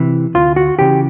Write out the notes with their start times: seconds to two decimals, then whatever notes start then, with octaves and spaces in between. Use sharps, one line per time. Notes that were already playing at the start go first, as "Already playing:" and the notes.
Already playing: C3 E3
0.34 D2 F4
0.56 F#4
0.79 C#3 E3 G4